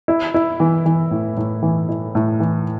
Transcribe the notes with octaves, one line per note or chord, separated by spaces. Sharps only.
E4
E4
E3
E3
A2
A2
E3
E4
A2
E3